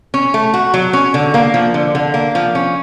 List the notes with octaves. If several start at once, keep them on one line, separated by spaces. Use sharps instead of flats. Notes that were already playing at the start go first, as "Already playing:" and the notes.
C#4
A3
F#4
F#3
C#4
D3
A#3
F3
D3
D3
A#3
F3
C#4